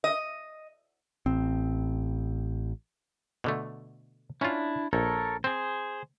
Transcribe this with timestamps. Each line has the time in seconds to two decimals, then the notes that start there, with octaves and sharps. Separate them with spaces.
0.04 D#5
1.26 A1 C4
3.44 B2 D3 A3
4.41 C#4 D4 E4 F4
4.93 A#1 A4 A#4 C#5
5.44 C4 G#4 C5